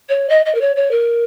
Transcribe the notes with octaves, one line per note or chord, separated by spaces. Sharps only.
C#5
D#5
D#5
A#4
C#5
C#5
A#4